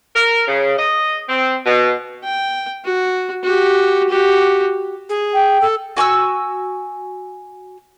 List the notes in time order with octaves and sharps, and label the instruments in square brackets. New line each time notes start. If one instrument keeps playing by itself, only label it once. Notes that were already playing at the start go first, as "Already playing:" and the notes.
[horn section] A#4
C#3
D#5
C4
B2
[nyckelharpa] G5
F#4
F#4 G4
F#4 G4
[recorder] G#4
[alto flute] G5
[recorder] A4
[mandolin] F#4 G#5 C#6 E6